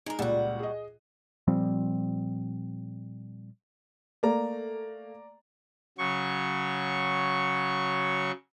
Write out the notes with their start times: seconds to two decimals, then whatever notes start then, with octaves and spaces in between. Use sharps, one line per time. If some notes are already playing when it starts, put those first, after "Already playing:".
0.06 G#3 D#4 A#4
0.19 C#2 A#2 G3 F#4 F#5
0.60 G#4 D#5
1.47 A#2 F3 G3 C4
4.23 A3 A#3 D5 A#5
5.98 C#3 F#3 C#6